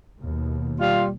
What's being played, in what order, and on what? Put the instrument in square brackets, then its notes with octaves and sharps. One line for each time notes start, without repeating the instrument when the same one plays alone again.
[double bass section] D#2 B2
[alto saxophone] G3 [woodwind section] F4 [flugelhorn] F5